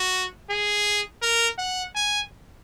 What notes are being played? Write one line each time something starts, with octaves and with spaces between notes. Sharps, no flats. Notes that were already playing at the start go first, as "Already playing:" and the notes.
Already playing: F#4
G#4
A#4
F#5
G#5